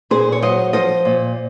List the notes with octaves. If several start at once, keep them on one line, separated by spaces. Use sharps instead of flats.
A#2 G#4 C5
C#5
F#3 C5 D#5
F3 C5 D#5
A#2